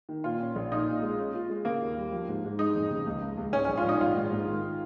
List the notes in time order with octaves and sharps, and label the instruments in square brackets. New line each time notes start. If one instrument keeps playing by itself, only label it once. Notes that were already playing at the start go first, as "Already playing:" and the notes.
[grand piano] D#3
[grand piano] A#2 [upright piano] F4
[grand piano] C#4
A#1
[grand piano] A#2 [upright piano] D#4
[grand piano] A#2
G#3
C#4
F4
G#3
[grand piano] C#3 [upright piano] A#3
[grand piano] D#2
G3
F3
G#2
G#2
[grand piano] G#3 [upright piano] D#4
[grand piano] F2
C#3
C#2
C#2
C#2
[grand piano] G#2 [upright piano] C#4
[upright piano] C#4
[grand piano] A#1
[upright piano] F4
[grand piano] A#1 [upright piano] D#4
[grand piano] G#1 [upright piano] F4
[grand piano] G#2
G#2
D#3